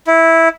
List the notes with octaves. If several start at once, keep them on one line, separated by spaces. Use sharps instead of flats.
E4